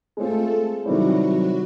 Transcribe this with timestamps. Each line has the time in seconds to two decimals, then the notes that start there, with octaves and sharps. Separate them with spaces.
0.17 G#3 A3 C4 F4 A4
0.85 C3 D#3 F#3 G3 C4 E4 F#4